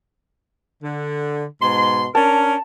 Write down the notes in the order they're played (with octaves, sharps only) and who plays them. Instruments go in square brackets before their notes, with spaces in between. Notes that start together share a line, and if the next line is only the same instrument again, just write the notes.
[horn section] D3
G#2 B2 C6
[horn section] C#4 D4 A#4 [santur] A5